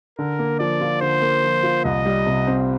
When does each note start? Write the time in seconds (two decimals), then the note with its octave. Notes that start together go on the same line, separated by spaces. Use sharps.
0.19 D3 A#4
0.39 A#3
0.59 F3 D5
0.81 F4
1.02 D3 C5
1.22 A#3
1.44 F3
1.63 F4
1.85 C2 D#5
2.05 G3
2.26 C3
2.47 C4